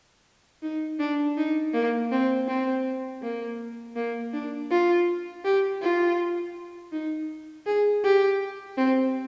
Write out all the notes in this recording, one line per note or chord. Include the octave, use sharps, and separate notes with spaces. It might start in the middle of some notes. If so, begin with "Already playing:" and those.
D#4
D4
D#4
A#3
C4
C4
A#3
A#3
D4
F4
G4
F4
D#4
G#4
G4
C4